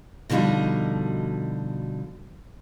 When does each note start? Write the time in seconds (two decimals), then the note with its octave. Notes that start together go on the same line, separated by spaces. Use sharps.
0.30 B2 D3 F3 G3 D#4 F#4